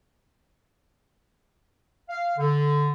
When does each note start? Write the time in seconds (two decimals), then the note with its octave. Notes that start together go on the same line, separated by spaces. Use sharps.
2.09 F5
2.37 D3